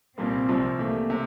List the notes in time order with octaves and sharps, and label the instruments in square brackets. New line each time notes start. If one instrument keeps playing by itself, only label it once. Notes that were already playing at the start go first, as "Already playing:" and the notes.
[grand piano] C2 A#2 G3 A#3 [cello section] C4
[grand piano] C2 C3 F3
[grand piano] E3 A3 E4 G4 [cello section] A#3
[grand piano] C3